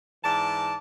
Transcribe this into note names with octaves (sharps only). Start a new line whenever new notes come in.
G#2 E3 D5 A5